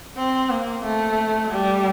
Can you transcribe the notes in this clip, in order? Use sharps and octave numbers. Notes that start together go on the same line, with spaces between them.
C4
A#3
A3
G3